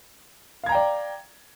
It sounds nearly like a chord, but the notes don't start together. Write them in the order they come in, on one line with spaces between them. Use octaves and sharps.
F5 G#6 A#5 G5 D5